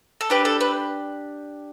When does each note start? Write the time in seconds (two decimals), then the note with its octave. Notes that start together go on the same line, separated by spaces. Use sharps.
0.21 A4
0.30 D4 G4 B4
0.45 A4
0.61 B4